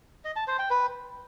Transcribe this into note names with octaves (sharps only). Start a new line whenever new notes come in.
D#5
A5
C5
G5
B4